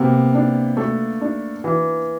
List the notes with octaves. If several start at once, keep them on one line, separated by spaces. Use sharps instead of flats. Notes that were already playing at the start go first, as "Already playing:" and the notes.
Already playing: C3 A#3 B3
D4
A3
D4
E3